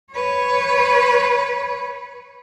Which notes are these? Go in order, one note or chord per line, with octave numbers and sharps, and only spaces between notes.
B4 C#5